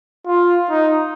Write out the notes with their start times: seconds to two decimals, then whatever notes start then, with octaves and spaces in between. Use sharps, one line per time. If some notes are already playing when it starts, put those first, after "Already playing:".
0.27 F4
0.70 D#4